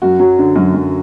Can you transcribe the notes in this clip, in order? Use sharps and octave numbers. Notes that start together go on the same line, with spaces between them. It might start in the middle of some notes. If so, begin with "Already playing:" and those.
F#2 F#4
F#3
D3
F#2
F#2